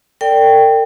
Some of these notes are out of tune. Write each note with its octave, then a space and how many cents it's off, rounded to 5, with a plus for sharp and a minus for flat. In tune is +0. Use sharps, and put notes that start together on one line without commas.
A#4 -45 D5 +0 G5 +0